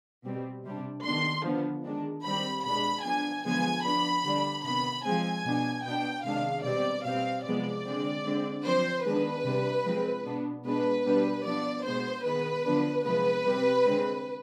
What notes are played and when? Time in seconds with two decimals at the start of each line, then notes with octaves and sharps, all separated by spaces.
0.25 B2 G3 C4
0.65 C3 G3 D4
1.05 D#3 B3 D4 C6
1.45 D3 F3 B3 D4
1.85 D#3 G#3 D4
2.25 D#3 G3 C4 B5
2.65 B2 G#3 D4 B5
3.05 F3 B3 D4 G#5
3.45 D3 F3 G#3 B3 G#5
3.85 F3 B3 D4 B5
4.25 D3 G3 D4
4.64 C3 D#3 B3 B5
5.05 F3 G#3 C4 G#5
5.45 B2 B3 D4
5.85 B2 B3 D4 G5
6.25 C3 D#3 G#3 D4 F5
6.65 B2 G3 C4 D5
7.05 B2 G3 C4 F5
7.45 C3 F3 G#3 B3 D5
7.85 D3 G#3 C4
8.25 D3 G#3 C4
8.65 F3 C4 C5
9.05 D#3 G#3 B3 D4 B4
9.45 C3 G3 D4
9.85 F3 G#3 C4
10.25 B2 B3 D4
10.65 B2 G#3 B3 D4 B4
11.05 B2 G3 B3 D4
11.45 F3 B3 D4 D5
11.85 B2 G#3 B3 C5
12.25 D#3 G#3 B3 B4
12.65 D3 F3 B3 D4
13.05 C3 F3 G#3 B3 B4
13.45 C3 G3 C4
13.85 D3 G#3 C4